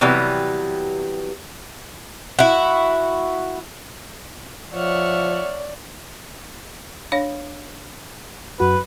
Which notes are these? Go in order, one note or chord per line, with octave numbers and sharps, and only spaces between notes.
C3 E3 F#3 G3 B3
E4 F#4
F3 C#5 D5 E5 F#5 F6
D4 C#5 F5
F#2 F#4 B4